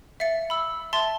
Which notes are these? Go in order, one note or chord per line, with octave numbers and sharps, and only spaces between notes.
E5 F5 A6 C#7
B5 E6
E5 A5 C6 A6